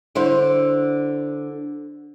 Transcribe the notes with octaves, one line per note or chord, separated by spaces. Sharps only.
D3 E4 C5